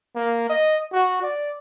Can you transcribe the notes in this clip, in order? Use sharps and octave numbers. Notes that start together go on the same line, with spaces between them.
A#3
D#5
F#4
D5